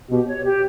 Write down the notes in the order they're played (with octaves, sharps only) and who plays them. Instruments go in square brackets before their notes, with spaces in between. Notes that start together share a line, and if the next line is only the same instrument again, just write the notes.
[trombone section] B2 [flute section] G4
[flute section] C#5
G4